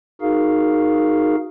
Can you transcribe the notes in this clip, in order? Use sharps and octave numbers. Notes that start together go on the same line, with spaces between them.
D#4 F#4 G#4 A#4 F5